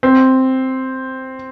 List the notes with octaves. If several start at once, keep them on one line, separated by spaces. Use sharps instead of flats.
C4